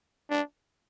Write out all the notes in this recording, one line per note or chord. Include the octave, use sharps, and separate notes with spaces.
D4